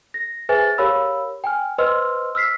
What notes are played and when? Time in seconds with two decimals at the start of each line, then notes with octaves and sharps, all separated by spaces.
0.14 A#6
0.49 G#4 B4 C5 E5 G#5 A6
0.78 G4 A#4 C#5 F5 B5 E6
1.44 G5 G#5 F6
1.78 B4 C5 D#5 C6 E6 F6
2.35 E6 F6 B6 C7